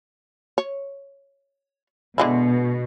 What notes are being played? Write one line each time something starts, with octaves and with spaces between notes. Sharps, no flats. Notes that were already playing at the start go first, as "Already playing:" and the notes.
C#5
B2 D3 G#3 E4